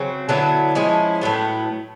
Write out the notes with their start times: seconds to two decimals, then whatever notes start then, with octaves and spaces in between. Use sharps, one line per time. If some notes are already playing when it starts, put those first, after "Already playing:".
Already playing: C#3 F#3 C4
0.29 D3 F#3 B3 E4
0.75 F3 G#3 C#4 E4
1.21 A2 F#3 B3